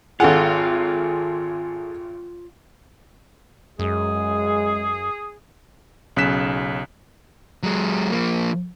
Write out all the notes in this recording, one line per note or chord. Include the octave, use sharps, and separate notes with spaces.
G#1 F4 G#4 A4 F5 F#5
F#2 G#3 G#4
B1 C#3 C#4 F#6 B6 E7
F#3 G#3
F3 A#3